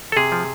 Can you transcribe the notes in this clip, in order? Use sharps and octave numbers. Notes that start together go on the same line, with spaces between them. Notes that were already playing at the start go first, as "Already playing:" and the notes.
A4
C3 G#4
F3